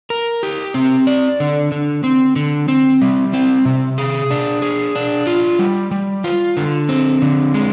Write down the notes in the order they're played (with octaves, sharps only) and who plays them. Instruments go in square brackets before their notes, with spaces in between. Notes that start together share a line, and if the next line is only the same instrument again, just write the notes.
[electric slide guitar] A#4
G4
C4
D5
D3
D3
C4
D3
C4
G3
C4
C3
G#4
D4
G#4
D4
F4
G3
G3
F4
D3
C4
D3
G#3